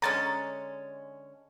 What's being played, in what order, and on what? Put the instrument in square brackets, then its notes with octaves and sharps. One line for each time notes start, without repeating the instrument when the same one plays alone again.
[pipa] D3 G#3 C#4 [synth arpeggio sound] A#5 A6